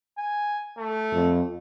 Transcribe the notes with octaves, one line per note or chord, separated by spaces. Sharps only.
G#5
A3
F2